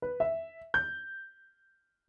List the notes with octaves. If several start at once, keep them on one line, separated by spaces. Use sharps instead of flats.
B4
E5
G6